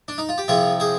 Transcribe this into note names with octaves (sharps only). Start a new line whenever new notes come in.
D4
D#4
F4
G4
C2 C3 F3 F4 G#4
G#4 C5